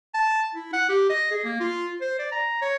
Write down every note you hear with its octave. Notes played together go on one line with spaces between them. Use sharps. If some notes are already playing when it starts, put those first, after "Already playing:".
A5
E4
F#5
G4
D#5
G#4
A#3
F4
C5
D5
A#5
C#5